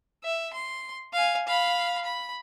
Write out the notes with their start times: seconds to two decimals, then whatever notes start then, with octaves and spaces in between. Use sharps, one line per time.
0.24 E5
0.53 C6
1.13 F5 G#5
1.47 F5 B5
2.04 B5